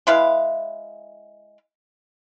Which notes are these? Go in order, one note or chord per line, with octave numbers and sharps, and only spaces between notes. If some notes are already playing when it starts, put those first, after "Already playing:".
G#3 E4 B4 F5